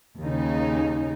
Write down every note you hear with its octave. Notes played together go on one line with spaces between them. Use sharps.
D#2 C#3 D#4